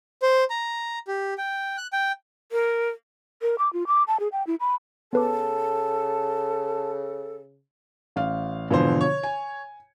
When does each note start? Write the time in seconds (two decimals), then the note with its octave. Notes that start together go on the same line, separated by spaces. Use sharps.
0.22 C5
0.50 A#5
1.08 G4
1.38 G5
1.78 F#6
1.93 G5
2.52 A#4
3.42 A#4
3.59 D6
3.73 F4
3.87 D6
4.08 A5
4.20 G#4
4.32 G5
4.47 E4
4.60 B5
5.13 C#3 B3 A4 B4 A5 D6
8.16 A1 F5
8.71 G#1 B2 D3 E3 F3 C5
9.01 C#5
9.23 G#5